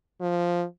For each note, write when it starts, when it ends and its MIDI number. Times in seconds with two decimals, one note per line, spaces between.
0.21 0.65 53